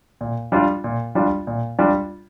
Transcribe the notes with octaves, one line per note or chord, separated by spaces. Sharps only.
A#2
G3 D4 F4
A#2
G3 D4 F4
A#2
G3 D4 F4